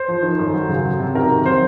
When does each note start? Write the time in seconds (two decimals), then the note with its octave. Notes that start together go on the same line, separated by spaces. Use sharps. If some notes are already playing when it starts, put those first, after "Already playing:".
Already playing: C5
0.08 F3
0.22 D#3
0.39 F#2
0.53 F#3
0.69 C#3
0.85 F#3
1.00 C3
1.15 D#3 A#4
1.31 C3
1.46 F#3 C5